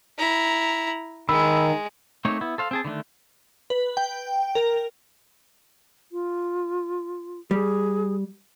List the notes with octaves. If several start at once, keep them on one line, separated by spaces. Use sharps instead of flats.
E4 A#5
D#3 G#3 B5 E6
A3 A#3 C4 D#4 C#5
B3 E4
A4 C5 F5
C4 G#4 A5
D3 D#3 A3 D4
B4
G5
A#4
F4
G3 G#4